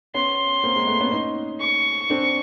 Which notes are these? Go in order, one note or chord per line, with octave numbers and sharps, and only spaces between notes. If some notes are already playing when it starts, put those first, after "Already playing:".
B3 C#4 C6
A#3 C4
G#3 A#3
A3 B3
B3 C#4
C#4 D#4
C#6
C4 D4